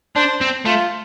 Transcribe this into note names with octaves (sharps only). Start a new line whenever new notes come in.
D4 C5
C4
A3 F4